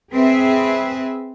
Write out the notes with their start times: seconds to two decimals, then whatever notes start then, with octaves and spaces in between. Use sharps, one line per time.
0.11 C4 G#4 B4 E5